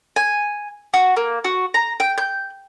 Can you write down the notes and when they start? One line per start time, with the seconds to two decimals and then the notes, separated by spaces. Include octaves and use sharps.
0.16 G#5
0.94 F#4
1.17 A#3
1.45 F#4
1.74 A#5
2.00 G5
2.18 G6